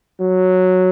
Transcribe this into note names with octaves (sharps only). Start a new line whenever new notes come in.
F#3